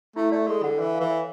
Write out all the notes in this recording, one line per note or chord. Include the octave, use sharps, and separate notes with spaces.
A3 E4
A3 D5
G#3 A4
D3 F#5
E3 A4
F5
E3
C#5